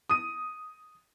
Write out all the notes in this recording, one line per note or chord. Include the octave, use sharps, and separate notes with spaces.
D#6 D#7